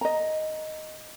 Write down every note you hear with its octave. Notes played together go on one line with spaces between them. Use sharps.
D#5 A#5